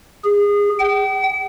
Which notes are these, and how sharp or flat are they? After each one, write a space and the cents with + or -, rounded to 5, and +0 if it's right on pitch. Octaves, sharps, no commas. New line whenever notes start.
G#4 -25
G5 -40